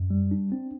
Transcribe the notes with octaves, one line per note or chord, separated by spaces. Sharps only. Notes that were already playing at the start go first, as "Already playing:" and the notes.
Already playing: F#2
G3
D4
C4